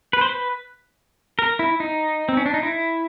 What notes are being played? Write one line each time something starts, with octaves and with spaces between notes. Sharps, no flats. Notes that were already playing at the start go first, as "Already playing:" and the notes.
B4
C5
B4
A#4
E4
D#4
C4
C#4
D4
D#4
E4